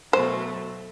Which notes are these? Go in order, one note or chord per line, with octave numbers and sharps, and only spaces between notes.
B2 F#3 A3 C5